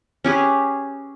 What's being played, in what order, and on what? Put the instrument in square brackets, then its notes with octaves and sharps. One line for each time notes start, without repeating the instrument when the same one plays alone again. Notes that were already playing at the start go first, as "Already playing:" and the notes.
[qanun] C#4 G4 G#4 B4